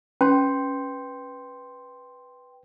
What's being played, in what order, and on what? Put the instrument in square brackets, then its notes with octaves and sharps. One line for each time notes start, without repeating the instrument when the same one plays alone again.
[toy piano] C#4 [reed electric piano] B4 [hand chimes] G5 C6